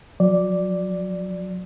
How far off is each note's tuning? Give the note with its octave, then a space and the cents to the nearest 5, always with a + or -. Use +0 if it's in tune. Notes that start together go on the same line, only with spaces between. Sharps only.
F#3 -35 D5 +0